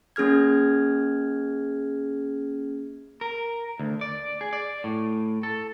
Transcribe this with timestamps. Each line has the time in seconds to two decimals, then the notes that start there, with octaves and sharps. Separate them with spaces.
0.16 A#3 C#4 G#4 F6 G#6
3.21 A#4
3.79 D2
4.01 D5
4.41 G#4
4.53 D5
4.84 A2
5.43 A4